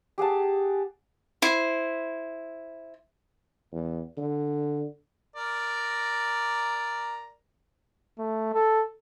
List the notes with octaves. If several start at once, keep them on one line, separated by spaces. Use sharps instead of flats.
G4 G#4 F#5 A5
E4 C5
E2
D3
A#4 D5 A#5
A3
A4